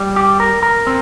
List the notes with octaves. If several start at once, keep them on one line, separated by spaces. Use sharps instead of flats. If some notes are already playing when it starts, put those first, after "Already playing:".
Already playing: G3
G4
A#4
A#4
C4